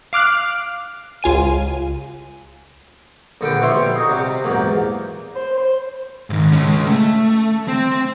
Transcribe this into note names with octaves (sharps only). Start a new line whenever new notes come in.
F5 D6 F6 F#6
C#2 F4 G#5 D#7
A#1 D3 A4 B4 G5
B2 F3 E4 C#5 E5 C6
G3
D#4 F#4 G#4
C3 G3
E2 G#2 F#3 A#3
C5
G#2 D#3
G#3 C#4
A3
C4